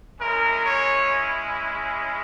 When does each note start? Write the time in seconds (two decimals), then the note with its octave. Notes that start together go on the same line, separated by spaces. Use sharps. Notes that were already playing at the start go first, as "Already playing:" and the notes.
0.20 G#3 C#4 E4 A#4
0.65 C#5